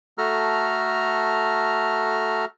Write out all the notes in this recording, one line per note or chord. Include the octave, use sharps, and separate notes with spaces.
A3 F#4 A4 A#5 F6